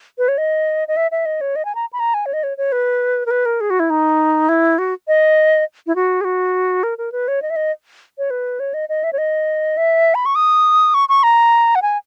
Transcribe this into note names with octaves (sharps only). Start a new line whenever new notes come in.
B4
C#5
D#5
D#5
E5
E5
D#5
C#5
D#5
G#5
A#5
B5
A#5
G#5
C#5
D#5
C#5
C#5
B4
A#4
B4
A#4
G#4
F#4
E4
D#4
E4
F#4
D#5
E4
F#4
G#4
F#4
A#4
A#4
B4
C#5
D#5
E5
D#5
C#5
B4
C#5
D#5
D#5
E5
C#5
D#5
E5
B5
C#6
D#6
C#6
C#6
A#5
F#5
G#5